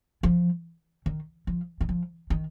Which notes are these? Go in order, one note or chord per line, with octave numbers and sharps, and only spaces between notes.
F3
D#3
F3
D#3
F3
D#3